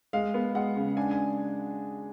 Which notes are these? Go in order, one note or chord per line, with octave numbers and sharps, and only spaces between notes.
G#3 F5
B3
G#3 F#5
C#3
D4 G#5
G#5